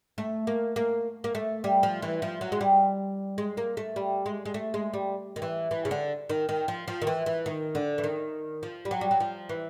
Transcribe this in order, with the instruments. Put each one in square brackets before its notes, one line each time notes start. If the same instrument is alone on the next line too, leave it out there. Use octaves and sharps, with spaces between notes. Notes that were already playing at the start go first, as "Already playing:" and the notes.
[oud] A3
A#3
A#3
A#3
A3
G3
F3
E3
F3
F#3
G#3
G3
G#3
A#3
A3
G3
G#3
G#3
A3
G#3
G3
D#3
E3
E3
C#3
D3
D#3
D#3
F3
F3
D#3
E3
E3
D#3
D3
E3
D#3
F3
G3
F#3
G3
F#3
F3
E3